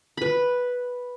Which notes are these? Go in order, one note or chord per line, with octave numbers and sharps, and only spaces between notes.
B4 B5